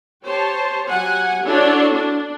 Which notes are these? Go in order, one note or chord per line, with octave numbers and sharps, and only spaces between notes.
G4 C5 C#5 A5
F#3 G4 F#5 G#5
D4 E4 F#4 A4 C#5
D4